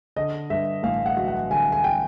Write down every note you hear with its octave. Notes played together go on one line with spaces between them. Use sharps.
D3 D#5
G2 E5
A1 F5
F#5
F#3
F#5
D3 G#5
G#5
G5